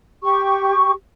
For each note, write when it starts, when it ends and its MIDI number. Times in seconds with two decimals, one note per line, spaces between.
0.24 0.92 67
0.24 0.92 85